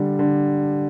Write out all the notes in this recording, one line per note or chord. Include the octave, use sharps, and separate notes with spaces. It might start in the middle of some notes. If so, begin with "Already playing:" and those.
Already playing: D3 G3
D3